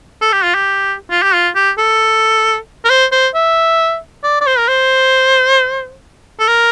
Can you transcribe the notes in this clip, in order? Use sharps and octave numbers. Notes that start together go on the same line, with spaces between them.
A4
G4
F4
G4
F4
G4
F4
G4
A4
A#4
C5
C5
E5
D5
D5
C5
A#4
C5
A4
A#4